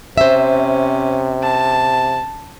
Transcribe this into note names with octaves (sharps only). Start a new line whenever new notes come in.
C3 C#4 C5 E5
A5